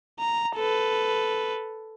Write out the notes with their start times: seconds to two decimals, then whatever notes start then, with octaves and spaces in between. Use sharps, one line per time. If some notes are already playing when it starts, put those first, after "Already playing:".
0.20 A#5
0.56 A4 B4